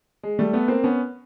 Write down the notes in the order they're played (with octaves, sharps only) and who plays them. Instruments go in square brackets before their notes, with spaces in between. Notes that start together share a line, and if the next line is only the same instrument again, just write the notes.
[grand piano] G#3
G3 A3
A3 B3
A#3 C4
B3 C#4